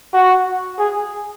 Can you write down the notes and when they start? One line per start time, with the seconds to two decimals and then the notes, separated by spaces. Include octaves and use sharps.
0.13 F#4
0.79 G#4